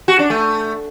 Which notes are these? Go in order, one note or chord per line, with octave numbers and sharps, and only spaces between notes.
F#4
D4
A3